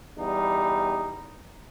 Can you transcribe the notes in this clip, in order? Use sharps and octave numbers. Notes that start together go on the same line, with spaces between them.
E2 G3 D#4